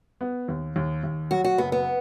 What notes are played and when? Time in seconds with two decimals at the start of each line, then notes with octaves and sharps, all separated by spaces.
0.21 B3
0.48 D#2
0.76 D#2
1.04 D#2
1.31 F#3 F#4
1.44 F#4
1.58 F#1 B3
1.72 B3